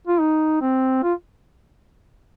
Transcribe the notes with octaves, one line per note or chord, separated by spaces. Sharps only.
F4
D#4
C4
F4